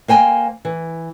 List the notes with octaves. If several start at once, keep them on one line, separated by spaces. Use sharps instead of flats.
A#3 C5 G5 G#5
E3